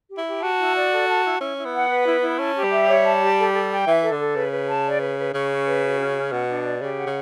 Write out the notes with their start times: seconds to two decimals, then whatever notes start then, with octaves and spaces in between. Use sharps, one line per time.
0.10 G4
0.18 E4
0.26 G4
0.42 F#4 A5
0.59 E4
0.76 D5
0.92 A4
1.08 A5
1.25 E4
1.40 C#4 E4
1.58 E4
1.65 B3
1.73 F#5
1.89 B4
2.06 E4
2.22 E4
2.39 C#4 A5
2.55 G4
2.64 G3
2.71 E5
2.88 C#5
3.04 A5
3.20 G4
3.38 A4
3.53 A4
3.70 G5
3.87 E3 E5
4.03 A4
4.12 D3
4.20 A4
4.35 C#3 B4
4.52 B4
4.69 A5
4.85 D5
5.01 B4
5.18 B4
5.34 C#3 C#4
5.51 C#4
5.66 B4
5.83 F#4
5.99 C#4
6.16 C#4
6.32 B2 F#5
6.48 D4
6.65 D5
6.81 C#3 G4
6.98 F#5
7.06 C#3